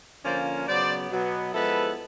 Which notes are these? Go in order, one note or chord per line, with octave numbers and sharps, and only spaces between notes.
D3 F3 A#3 C#4 F4 C5 D5
C#3 F#3 B3 C5 D5
B2 F#3 B3
F3 G#3 B3 E4 A4 B4